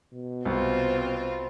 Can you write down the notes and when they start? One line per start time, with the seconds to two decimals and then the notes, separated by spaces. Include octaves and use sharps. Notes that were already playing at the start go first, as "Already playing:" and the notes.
0.13 B2
0.45 C2 C4 F4